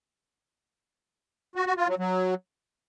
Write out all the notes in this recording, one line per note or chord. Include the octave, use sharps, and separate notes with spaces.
F#4
F#4
F4
F#3
F#3